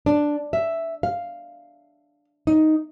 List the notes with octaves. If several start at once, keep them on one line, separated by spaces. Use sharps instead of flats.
D4
E5
F5
D#4